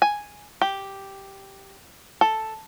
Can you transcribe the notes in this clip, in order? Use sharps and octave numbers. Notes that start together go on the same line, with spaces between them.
G#5
G4
A4